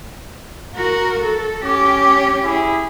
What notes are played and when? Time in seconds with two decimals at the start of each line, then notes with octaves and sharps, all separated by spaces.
0.75 F#4 A#4
1.22 A4
1.64 C#4 G4 D6
2.44 E4 G#4